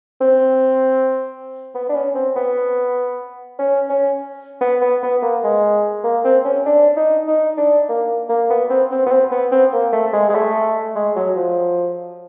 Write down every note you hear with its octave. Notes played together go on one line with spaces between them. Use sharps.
C4
B3
D4
C#4
C4
B3
C#4
C#4
B3
B3
B3
A#3
G#3
A#3
C4
C#4
D4
D#4
D#4
D4
A#3
A#3
B3
C4
C4
B3
C4
B3
C4
A#3
A3
G#3
G#3
A3
G#3
F#3
F3